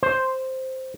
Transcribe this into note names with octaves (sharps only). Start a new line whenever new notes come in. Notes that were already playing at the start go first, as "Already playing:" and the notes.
C5